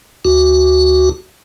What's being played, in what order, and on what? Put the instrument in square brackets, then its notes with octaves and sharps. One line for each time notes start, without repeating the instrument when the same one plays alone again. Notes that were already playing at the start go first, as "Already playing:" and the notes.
[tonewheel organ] D2 F#4